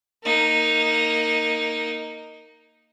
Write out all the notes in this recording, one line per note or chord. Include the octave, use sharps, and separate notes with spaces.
A#3 D#4